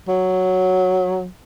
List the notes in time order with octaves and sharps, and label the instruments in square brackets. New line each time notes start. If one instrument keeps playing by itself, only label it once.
[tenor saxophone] F#3